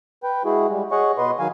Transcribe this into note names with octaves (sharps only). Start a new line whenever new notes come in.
B4 G5
G#3 E4 F#4 G#4
G3 G#3
G#4 C#5 D#5 F#5 C#6
B2 B4 D#5 C6
D#3 F#3 F5 G#5